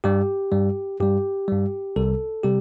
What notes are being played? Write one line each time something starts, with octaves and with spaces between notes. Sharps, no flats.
G2 G3 G4
G2 G3
G2 G3 G4
G2 G3
C2 C3 G3 A4
C3 G3 G4